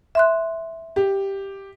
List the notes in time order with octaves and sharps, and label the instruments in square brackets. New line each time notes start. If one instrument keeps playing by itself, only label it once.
[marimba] E5 C6 F#6
[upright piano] G4